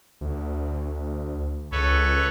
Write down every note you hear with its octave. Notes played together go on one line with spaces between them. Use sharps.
D2
C#2 A4 B4 C#5